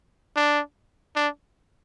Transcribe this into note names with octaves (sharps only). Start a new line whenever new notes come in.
D4
D4